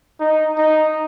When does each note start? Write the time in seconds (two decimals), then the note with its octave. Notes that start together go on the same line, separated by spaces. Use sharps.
0.20 D#4
0.58 D#4